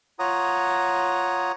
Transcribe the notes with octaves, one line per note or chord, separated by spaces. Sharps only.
F4 C#5 F#5 A#5 D#6